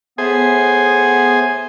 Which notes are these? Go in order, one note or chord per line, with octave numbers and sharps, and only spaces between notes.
A2 B3 G#4 C5 G#5